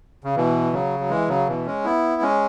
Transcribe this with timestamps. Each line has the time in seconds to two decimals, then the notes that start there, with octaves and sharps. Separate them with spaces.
0.24 C#3
0.36 B2 E3
0.73 C#3 F#3
1.00 F#3
1.09 E3 G#3
1.28 C#3 F#3
1.47 B2 E3
1.66 G#3 C#4
1.85 B3 E4
2.22 G#3 C#4